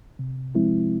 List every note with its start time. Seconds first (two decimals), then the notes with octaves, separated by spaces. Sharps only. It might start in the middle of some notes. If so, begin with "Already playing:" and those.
0.19 C3
0.55 F3 G#3 C4 E4